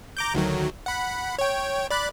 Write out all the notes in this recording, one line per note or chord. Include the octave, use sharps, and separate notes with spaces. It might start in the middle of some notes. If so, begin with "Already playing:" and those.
A#5 D6 G6
D2 D#3 F#3
F#5 B5
C#5 G5
D5 B5 F#6